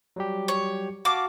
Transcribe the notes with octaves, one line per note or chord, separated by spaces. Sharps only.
F#3 G3 G4
C#5
F#4 F5 A5 D6